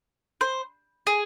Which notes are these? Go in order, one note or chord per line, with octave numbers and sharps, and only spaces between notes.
C5
G#4